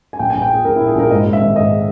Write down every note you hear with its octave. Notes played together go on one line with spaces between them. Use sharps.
G#5
A#1 G5
G#5
A#1
G5
A#2 G#4
A#1 A#4
E4
A#2
G#4
A#1 A#4
G#2 D#5
G#2
E5
G#1
G#2 D#5